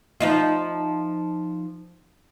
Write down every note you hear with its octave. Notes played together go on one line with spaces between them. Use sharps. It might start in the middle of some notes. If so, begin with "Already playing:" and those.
F3 D#4 F4